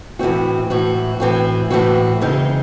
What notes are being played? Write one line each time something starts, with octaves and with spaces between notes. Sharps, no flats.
A2 E3 C4 F#4
A2 E3 C4 F#4
A2 E3 C4 F#4
A2 E3 C4 F#4
E2 C#3 G#3 C4 D#4